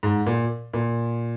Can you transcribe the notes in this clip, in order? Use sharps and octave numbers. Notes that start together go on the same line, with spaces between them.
G#2
A#2
A#2